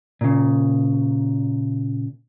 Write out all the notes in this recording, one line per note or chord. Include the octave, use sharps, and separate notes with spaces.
A#2 C#3